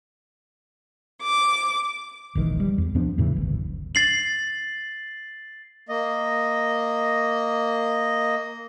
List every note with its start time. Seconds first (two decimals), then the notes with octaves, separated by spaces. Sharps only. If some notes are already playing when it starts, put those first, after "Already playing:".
1.23 D6
2.35 E1 A#1 D#3 E3
2.60 G3
2.78 E2
2.95 E2 F3 B3 D4
3.18 E2 A2 C#3 E3
3.36 D1 G1
3.95 A6 C7 F#7
5.89 A#3 D#5